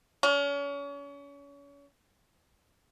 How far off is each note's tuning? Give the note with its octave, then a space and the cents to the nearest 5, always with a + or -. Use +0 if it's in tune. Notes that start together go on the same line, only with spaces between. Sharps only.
C#4 +35